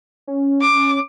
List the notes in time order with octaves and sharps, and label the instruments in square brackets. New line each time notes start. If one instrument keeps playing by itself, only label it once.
[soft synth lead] C#4
[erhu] D6